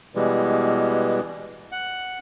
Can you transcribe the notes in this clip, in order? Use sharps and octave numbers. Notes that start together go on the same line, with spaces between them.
B2 E3 G3 G#3
F#5